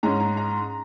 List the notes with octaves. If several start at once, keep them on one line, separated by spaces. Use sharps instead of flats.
G#2 G#3 C#4 A#5
A#5
A#5